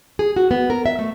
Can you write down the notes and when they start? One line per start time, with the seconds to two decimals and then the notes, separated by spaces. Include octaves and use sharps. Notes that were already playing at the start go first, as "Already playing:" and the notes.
0.19 G#4
0.36 F#4
0.51 B3
0.70 A#4
0.86 E5
0.99 A3